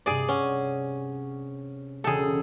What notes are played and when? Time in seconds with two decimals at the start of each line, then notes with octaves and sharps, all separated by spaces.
0.06 G2 C3 G#4 D5
0.29 C#4 F#5
2.04 E1 C#3 G#4 A4 G5